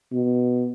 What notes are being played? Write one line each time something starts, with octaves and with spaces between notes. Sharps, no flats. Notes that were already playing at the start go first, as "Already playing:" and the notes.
B2